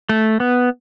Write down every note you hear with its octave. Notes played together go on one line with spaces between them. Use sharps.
A3
B3